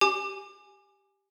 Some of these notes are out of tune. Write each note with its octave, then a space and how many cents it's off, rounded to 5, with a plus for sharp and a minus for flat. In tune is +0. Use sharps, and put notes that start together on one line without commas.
G4 +0 G#5 +0 D6 +30